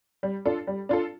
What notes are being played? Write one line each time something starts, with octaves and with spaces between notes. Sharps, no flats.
G3
D4 F4 A4
G3
D4 F4 A4